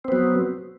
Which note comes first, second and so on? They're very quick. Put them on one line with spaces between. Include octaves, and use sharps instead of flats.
C4 B3 F#3